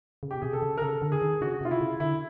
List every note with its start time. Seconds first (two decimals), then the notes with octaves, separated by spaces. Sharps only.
0.23 C#3
0.31 G4
0.37 B2
0.42 C3 G#4
0.53 A4
0.62 C#3
0.77 A#4
0.82 C#3 A4
1.02 D3
1.12 G#4
1.22 D#3
1.41 C#3 F#4
1.61 C3 F4
1.71 E4
1.81 C#3
2.00 D3 E4